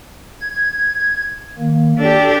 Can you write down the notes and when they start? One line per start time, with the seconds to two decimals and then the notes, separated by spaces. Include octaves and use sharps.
0.41 G#6
1.59 D#3 A#3
1.99 D4 G4 A4